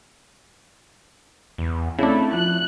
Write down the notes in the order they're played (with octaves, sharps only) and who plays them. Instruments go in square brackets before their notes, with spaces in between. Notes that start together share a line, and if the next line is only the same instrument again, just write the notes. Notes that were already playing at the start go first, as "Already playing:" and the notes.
[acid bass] E2
[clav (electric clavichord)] C#3 D4 [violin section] A3 [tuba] C4 [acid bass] E4
[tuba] F3 [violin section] F#6